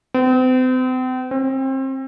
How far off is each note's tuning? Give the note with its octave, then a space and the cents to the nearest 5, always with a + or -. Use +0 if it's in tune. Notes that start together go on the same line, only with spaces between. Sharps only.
C4 -40
C4 +30